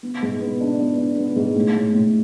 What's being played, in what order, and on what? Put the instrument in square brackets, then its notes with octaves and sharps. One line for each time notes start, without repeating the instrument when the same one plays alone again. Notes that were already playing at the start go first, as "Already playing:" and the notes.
[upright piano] B3
G#2
B3
D4
B3
D4
B3
G#2
A2
A2
A2